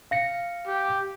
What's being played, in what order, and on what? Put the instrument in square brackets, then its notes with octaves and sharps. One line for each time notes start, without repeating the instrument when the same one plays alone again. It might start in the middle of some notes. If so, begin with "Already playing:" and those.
[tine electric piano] F5 A#6 C#7
[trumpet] G4